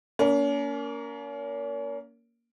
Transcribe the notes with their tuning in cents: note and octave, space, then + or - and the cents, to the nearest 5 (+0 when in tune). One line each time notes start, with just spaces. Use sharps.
A#3 +0 C#4 +40